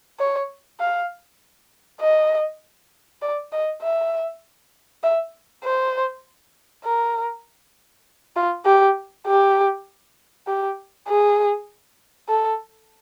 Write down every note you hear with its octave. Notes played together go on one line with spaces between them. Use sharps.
C#5
F5
D#5
D5
D#5
E5
E5
C5
A#4
F4
G4
G4
G4
G#4
A4